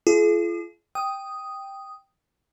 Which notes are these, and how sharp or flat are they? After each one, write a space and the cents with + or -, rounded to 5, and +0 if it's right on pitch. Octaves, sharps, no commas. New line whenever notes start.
F4 -35 G#4 +45 D#6 -45
G5 +0 D#6 +0